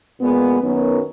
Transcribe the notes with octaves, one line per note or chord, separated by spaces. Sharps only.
A#2 G#3 B3
F#2 D#3 F#3 B3